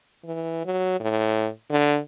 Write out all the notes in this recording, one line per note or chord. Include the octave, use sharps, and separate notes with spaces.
E3
F#3
A2
D3